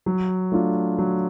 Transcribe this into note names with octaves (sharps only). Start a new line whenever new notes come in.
F#3
A3 D4 F4
F#3